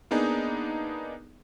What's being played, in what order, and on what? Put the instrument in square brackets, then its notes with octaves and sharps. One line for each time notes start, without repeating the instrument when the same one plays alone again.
[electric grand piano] A#3 B3 D4 D#4 G#4